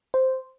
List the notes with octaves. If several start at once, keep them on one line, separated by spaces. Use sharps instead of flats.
C5